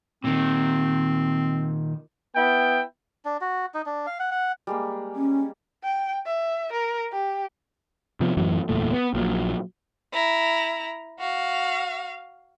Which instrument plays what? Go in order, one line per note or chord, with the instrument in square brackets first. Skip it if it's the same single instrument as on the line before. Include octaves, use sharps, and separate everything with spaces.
[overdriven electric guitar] A#2 D#3 [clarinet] C4
[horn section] B3 E4 G5
[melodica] D4
F#4
D#4
D4
F5
F#5
F#5
[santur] G3 G#3 A#3
[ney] C#4
[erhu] G5
E5
A#4
G4
[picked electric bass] C3 F3 B3
A1 F#2 E3 F#3
F#1 E2 A#2 A3
B3
A#1 A#2 F#3
[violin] E4 A#5
F#4 F5